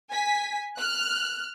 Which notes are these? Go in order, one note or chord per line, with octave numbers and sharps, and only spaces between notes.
G#5 B6
F6 F#6